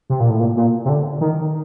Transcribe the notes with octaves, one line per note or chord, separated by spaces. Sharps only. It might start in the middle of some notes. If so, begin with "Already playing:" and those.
C3
A#2
A2
A#2
A#2
C3
D3
D#3